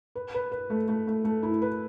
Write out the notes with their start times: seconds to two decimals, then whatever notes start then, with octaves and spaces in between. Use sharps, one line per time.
0.15 B4
0.34 B4
0.52 B4
0.70 A3
0.88 A3
1.07 A3
1.24 A3
1.43 E4
1.62 B4